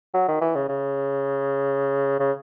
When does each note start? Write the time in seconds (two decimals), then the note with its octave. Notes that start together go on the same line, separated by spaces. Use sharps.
0.14 F#3
0.28 D#3
0.41 E3
0.55 C#3
0.69 C#3
2.20 C#3